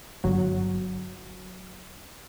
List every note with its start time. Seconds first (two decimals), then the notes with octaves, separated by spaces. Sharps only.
0.24 G1 F#3